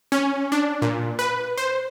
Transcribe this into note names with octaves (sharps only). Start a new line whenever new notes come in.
C#4
D4
A#2
B4
C5